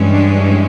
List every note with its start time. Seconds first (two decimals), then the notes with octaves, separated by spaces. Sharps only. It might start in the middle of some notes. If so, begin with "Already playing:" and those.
Already playing: G2 E3 G#3 C#4
0.11 D4